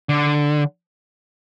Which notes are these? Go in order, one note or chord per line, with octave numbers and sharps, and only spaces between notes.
D3